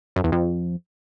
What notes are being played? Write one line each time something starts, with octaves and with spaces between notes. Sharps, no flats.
F#2
E2
F2